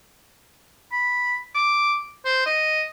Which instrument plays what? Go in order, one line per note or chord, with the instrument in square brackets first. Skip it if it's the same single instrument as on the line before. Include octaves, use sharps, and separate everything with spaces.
[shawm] B5
D6
C5
D#5